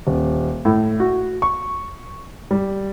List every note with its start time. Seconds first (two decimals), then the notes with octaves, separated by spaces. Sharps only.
0.07 D#1
0.65 A2
1.00 F#4
1.42 C#6
2.51 G3